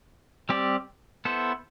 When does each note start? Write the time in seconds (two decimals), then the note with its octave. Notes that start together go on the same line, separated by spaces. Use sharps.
0.49 G3 C4 G4 D5
1.25 B3 E4 A4 C5